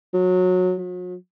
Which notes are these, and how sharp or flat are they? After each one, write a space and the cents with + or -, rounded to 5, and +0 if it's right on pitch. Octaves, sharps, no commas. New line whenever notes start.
F#3 -20
F#3 -45